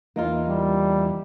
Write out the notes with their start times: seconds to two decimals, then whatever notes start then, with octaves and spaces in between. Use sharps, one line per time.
0.16 E2 E3 A#3 D#4 F4
0.48 G3